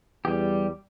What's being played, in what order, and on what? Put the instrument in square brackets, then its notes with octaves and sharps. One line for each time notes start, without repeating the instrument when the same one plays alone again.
[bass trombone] E2 [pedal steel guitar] G3 G4